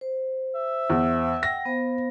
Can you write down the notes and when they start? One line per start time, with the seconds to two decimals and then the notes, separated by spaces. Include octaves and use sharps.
0.01 C5
0.55 E5
0.90 E2
1.43 F#5 G5 A#6
1.65 B3 C5 F5